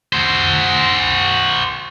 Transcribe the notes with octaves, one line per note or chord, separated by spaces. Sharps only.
F#4 C5